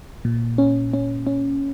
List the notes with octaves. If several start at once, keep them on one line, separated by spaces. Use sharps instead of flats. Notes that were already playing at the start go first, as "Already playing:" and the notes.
A#2
C#4
C#4
C#4